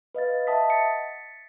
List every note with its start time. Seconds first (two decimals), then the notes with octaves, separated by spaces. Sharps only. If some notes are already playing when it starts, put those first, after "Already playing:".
0.15 B4 D#5 F5 A6
0.47 D#5 E5 F#5 A5 D#6 B6
0.70 A6 B6 C#7